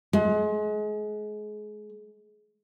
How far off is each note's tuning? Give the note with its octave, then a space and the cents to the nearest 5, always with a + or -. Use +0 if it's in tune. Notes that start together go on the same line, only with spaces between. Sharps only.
G#3 +30